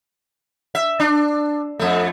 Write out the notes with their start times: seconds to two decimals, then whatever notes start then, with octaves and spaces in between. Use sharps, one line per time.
0.75 E5
1.00 D4
1.80 F2 A3